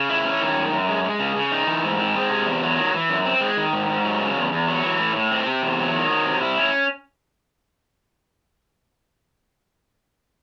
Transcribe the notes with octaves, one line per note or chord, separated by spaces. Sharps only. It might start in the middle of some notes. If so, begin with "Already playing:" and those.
Already playing: C#3
E4
C#4
D#3
F#2
F#2
G#3
G#3
C#3
C#3
D#4
E3
G#2
C4
G#3
C3
E2
F#3
D#3
E3
F#2
C4
G#3
D#3
G#2
G#2
F#3
C#3
E2
E2
F#3
E3
A2
A2
C4
C3
E2
F#3
D#3
F#3
C3
E4
C#4